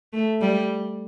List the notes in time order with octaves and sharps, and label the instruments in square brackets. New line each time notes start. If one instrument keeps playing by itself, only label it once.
[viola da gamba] A3
G3